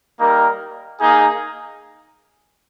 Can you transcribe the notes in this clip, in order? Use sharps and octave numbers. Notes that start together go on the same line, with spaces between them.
G3 A#3 D#4 A#4
A#3 D#4 G#4